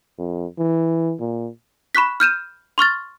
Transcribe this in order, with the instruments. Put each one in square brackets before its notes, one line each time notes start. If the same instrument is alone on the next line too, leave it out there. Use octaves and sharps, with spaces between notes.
[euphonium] F2
E3
A#2
[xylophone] B5 C#6 F#6 B6
F6 G6 D#7 E7
C6 C#6 F6 A6